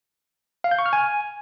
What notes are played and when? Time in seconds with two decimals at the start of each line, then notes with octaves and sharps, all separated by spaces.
0.64 F5
0.71 G6
0.79 C#6
0.86 F6
0.93 G#5